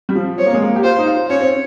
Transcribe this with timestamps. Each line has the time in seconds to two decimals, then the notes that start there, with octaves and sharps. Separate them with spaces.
0.09 G3
0.15 F3
0.38 C4 C#5
0.46 A#3
0.54 G#3
0.62 A#3
0.76 G4
0.84 F4 C5
0.99 D#4
1.07 F4
1.30 C#4 C#5
1.41 C4